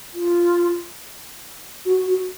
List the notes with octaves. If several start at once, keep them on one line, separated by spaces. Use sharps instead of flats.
F4
F#4
F#4